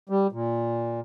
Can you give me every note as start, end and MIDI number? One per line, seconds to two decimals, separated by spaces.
0.09 0.27 55
0.32 1.00 46